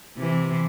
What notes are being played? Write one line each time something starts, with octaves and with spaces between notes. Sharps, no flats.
C3 E3